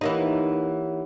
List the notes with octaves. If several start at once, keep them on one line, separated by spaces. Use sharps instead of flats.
E3 A#3 D#4 G4 C#5 F#5